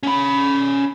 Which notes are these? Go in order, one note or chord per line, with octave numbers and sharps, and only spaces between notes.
C#4 B5